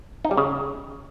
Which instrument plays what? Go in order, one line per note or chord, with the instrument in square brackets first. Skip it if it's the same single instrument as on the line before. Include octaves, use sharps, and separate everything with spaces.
[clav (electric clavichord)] D#4
G3
C#3